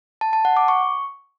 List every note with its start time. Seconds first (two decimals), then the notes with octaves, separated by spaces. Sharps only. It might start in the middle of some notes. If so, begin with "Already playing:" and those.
0.21 A5
0.33 A5
0.45 F#5
0.57 D6
0.68 C#6